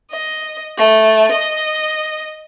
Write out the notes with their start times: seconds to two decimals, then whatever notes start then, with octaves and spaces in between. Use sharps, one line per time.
0.10 D#5
0.76 A3
1.31 D#5